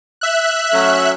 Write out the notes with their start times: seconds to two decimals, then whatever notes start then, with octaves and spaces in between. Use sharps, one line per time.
0.21 E5 F#6
0.72 F#3 A3 C#4